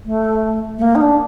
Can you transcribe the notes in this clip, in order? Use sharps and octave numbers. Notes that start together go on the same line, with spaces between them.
A3
A3
A#3
D#4
D4